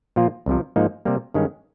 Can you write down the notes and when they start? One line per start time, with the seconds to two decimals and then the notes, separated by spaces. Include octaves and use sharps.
0.16 A#2 F3 A#3 F4
0.46 C2 C3 F3
0.76 G#2 F3 A#3 D#4
1.05 C3 G3 A#3
1.34 G2 D#3 G#3 C#4